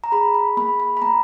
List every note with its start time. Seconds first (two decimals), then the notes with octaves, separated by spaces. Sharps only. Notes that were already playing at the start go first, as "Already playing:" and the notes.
0.04 A#5
0.12 G#4 B5
0.34 B5
0.57 A#3 B5
0.80 B5
0.97 B5
1.02 A#3 A#5